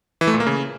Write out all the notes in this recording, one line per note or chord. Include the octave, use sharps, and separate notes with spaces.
E3
A3
A#2
A#3
C#3